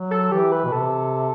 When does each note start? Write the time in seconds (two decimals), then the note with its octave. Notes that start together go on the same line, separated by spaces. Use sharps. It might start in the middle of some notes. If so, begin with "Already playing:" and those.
Already playing: F#3
0.11 A4
0.32 E3 G4
0.52 B4
0.64 B2
0.72 C3 A4